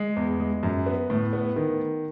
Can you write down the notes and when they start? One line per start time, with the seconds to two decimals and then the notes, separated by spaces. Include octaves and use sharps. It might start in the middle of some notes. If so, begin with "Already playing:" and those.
Already playing: G#3
0.16 E2
0.40 G#3
0.63 F#2
0.86 B3
1.10 A2
1.33 B3
1.56 D#3